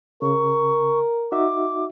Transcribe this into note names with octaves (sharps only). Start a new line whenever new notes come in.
C#3 A#4 C#6
D#4 F#4 E5 D6